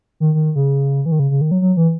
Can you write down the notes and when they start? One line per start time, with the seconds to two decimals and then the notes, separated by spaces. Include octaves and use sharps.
0.20 D#3
0.35 D#3
0.55 C#3
1.06 E3
1.12 D#3
1.19 C#3
1.31 C#3
1.41 D#3
1.51 F#3
1.62 F#3
1.77 E3